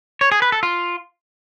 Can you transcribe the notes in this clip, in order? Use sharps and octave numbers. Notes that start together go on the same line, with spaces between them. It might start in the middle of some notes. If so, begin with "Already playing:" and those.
C#5
G#4
B4
A4
F4